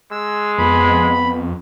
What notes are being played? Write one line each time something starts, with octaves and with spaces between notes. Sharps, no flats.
G#3 E6
F2 B3 B5